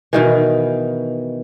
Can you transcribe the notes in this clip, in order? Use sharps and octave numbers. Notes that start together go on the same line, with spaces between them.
B2 D#3 E3